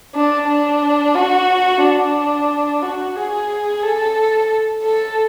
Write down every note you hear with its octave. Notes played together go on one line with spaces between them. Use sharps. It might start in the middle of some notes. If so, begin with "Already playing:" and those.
D4
D4
F#4
D4
F#4
G#4
A4
A4